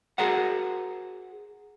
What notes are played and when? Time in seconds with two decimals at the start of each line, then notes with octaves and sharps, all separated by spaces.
0.18 F#4 G#4 A#4 C5 F#5